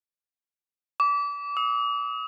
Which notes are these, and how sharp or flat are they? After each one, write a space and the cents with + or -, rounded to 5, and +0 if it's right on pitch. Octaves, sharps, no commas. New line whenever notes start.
D6 -30
D#6 +40